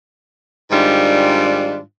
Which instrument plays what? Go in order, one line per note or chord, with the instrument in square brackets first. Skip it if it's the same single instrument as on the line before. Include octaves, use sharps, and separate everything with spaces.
[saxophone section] G#2 D#3 G3 D4 F4